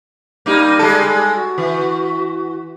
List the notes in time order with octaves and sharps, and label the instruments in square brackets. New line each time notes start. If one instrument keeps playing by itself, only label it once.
[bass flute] G3 [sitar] A#3 D#4
[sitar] G#3 A4
[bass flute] F#4
[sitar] E3